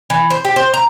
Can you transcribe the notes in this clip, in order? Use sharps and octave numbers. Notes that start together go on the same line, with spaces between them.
E3
C5
G4
C5
A#5